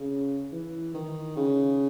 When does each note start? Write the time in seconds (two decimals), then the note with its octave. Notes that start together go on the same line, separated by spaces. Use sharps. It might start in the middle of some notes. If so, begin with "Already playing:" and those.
Already playing: C#3
0.52 E3
0.94 D#3
1.36 C#3